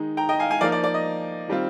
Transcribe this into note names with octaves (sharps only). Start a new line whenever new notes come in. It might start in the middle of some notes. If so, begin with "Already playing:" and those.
Already playing: D#3 G#3 D#4
G5 A#5
D#5 G5
F5 G#5
F5 G#5
F3 A#3 D#4 D5 F5
D5
D5
D#5
D#3 G3 C4 F4